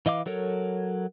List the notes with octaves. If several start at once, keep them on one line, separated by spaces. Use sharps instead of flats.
E3 D#5 F5 D6
F#3 A4 A#4 C#5